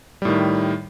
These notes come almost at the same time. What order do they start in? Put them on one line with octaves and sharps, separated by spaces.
G3 A2 D#3